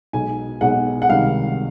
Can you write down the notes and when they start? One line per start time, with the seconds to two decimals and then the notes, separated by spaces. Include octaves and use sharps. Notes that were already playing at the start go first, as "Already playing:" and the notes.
0.13 B1 B2 G#3 G#5
0.61 B1 B2 G#3 F#5
1.02 F#5
1.09 C#2 C3 D#3 G3 F5